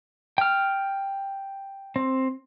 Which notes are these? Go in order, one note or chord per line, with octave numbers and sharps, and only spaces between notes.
G5 F6
C4